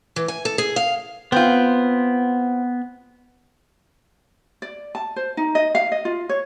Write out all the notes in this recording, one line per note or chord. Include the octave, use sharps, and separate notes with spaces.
E3
G#5
A4
G#4
F5
B3 C4 F4
D5
A5
C5
D#4
D#5
F5
D#5
F4
C#5